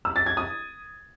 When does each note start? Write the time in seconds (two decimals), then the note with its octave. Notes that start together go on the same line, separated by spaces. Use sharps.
0.05 E6
0.16 A6
0.26 G#6
0.37 D#6